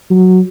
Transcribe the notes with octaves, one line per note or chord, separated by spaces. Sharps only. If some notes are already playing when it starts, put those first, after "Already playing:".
F#3